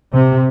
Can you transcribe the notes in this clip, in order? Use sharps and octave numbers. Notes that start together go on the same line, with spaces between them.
C3